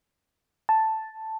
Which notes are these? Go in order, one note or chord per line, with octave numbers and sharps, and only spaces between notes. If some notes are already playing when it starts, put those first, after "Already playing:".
A5